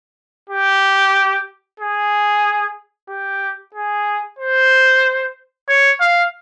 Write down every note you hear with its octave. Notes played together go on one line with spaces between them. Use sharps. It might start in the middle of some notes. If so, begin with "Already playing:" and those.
G4
G#4
G4
G#4
C5
C#5
F5